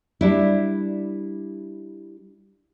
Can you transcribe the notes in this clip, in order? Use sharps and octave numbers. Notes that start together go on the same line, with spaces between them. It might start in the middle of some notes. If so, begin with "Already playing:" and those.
G3 D4 E4